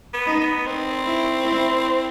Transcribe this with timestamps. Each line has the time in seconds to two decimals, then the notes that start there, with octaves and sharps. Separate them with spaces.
0.13 B3
0.27 D#4
0.40 B3
0.66 C4 D#4
1.06 E4
1.45 E4